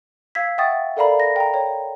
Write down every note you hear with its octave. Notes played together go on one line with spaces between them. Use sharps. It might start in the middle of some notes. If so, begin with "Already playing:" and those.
F5 E6 G#6 B6
E5 F#5 G5 C#6 D#6 A6
A4 A#4 D5 F5 A#5 B5
A#6
G5 A#5
C#5 G5